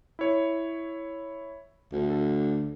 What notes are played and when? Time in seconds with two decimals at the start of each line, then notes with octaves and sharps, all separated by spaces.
0.19 E4 C#5
1.92 D2
2.10 A4